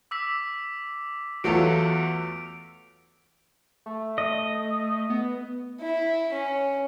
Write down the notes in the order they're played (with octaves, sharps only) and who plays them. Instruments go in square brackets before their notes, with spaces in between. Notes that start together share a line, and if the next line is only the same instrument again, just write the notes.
[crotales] D6 E6 B6
[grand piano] E2 A3 A4 [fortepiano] F#3 F4 [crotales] D7 F7
[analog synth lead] A3
[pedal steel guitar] D#5
[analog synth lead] B3
[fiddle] E4
C#4